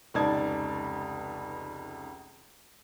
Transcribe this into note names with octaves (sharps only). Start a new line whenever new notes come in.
F1 C#2 D#4 D5 A5 G#6